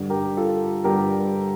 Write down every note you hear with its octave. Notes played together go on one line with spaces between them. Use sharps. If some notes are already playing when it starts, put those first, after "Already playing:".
Already playing: G2 D3 G3
G4 A#4
F4 A4
G2 D3 G3 G4 A#4